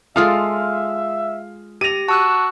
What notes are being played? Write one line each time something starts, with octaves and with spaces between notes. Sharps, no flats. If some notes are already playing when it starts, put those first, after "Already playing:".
G#3 F4 A4 E5 F5 D#6 F6
G4 A#6 D#7 F7
F#4 A5 E6 F#6